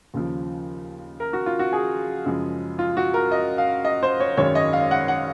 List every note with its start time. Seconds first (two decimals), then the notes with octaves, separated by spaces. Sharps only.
0.14 D#2 C#3 F3
1.20 A#4
1.33 F#4
1.46 F4
1.59 F#4
1.73 G#4
2.25 F#2 C#3 F3 G#3
2.79 F4
2.97 F#4
3.14 A#4
3.31 D#5
3.58 F5
3.85 D#5
4.03 C5
4.20 C#5
4.37 G#1 F#2 D#3 G#3 C#5
4.55 D#5
4.73 F5
4.91 F#5
5.08 F#5